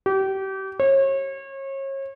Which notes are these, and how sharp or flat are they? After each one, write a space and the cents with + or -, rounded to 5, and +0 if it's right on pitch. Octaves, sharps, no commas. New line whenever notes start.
G4 -30
C#5 -35